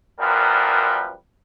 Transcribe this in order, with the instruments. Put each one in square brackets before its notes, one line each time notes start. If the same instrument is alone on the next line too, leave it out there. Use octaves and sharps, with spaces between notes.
[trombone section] F#2 A#2 F3 G3 A#4 B4